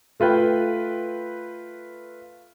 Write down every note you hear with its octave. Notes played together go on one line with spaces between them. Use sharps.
A3 F4 B4 G5